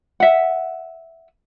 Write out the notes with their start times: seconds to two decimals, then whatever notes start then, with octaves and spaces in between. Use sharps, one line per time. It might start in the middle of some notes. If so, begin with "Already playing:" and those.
0.20 E5 F#5